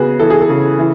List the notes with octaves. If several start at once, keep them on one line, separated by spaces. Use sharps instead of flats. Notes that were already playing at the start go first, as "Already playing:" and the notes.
Already playing: C#3 B3 F#4 G#4
E3 A4
G#4
A4
C#3
E3